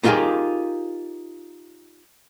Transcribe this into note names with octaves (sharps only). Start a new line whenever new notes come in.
B3 D#4 F4 G4 G#4 A#4